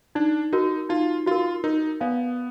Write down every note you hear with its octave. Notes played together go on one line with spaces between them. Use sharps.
D4 D#4
D#4 F#4 A#4
D#4 F4
F4 F#4 A#4
D#4 A#4
B3 D5 F5 G#5